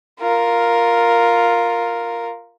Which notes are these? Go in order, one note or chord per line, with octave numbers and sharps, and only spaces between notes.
F4 A#4